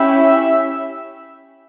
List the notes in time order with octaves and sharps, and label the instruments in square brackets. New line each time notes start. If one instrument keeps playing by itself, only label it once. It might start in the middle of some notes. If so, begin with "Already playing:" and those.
Already playing: [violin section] C#4 E4 G4 [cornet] E5